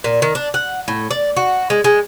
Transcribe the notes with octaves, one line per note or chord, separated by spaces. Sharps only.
A#2
D#3
D4
F#5
A2
D5
F#4
G#3
G#3